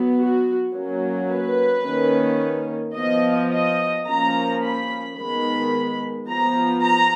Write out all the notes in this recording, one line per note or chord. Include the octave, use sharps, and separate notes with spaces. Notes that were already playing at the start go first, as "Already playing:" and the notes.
Already playing: F#3 B3
F#4
F#3 A#3 C#4
B4
D#3 A#3 C#4
F3 B3 D#5
D#5
F3 A#3 C#4 A#5
B5
D#3 G#3 B3 B5
F3 B3 A#5
A#5